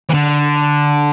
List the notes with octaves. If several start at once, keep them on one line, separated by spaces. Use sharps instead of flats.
E3
D3